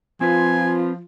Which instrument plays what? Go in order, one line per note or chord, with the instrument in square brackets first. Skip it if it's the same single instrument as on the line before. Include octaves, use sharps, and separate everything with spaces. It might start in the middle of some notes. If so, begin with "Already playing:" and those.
[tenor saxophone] F3 [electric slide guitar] C4 B4 [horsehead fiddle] F4 [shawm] G#5